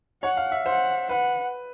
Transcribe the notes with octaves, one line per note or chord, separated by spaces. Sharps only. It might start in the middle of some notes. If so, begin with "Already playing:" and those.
C#5 F#5
F5
E5
C5 F#5
B4 F#5